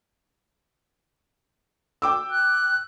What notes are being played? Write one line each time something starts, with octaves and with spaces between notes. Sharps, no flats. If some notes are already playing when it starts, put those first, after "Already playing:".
G5 D6 E6
F#6